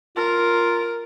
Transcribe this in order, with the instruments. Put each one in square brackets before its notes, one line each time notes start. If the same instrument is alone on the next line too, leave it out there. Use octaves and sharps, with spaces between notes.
[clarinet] F4 [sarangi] A#4